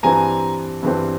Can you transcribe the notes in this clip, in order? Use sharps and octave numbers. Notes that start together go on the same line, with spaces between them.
G2 E3 G3 C4 G#5 A#5
G2 E3 G3 C4